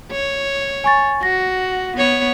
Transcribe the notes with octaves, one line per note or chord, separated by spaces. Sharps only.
C#5
G#5 C#6 A6
F#4 A#6
B3 C#5